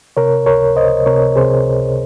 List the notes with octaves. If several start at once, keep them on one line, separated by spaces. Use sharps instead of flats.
C3 A#4 C#5
C#2 A#4 C#5
C#2 C5 D#5
C3 A#4 C#5
C3 G#4 C5
C#2